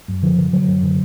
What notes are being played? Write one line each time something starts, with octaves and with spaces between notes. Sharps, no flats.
F#2
D3 F3
D3
D3 F#3
F#2
D3